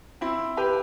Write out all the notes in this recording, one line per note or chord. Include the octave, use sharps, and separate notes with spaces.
C4 E4
G4 B4